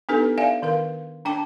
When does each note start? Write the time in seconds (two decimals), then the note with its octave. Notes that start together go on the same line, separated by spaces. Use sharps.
0.09 B3 D4 D#4 G4 A4 B4
0.38 D5 E5 F5 G#5
0.62 D#3 A#4 F5
1.25 D4 G5 A5 D6